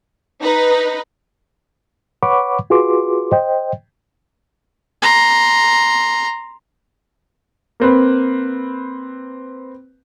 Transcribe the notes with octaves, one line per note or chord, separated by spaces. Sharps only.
D#4 B4
B4 C#5 F#5 B5 C#6 D6
F4 F#4 G#4 B4 C6 D6
C5 D#5 G5
A#5 C6
A#3 C4 B4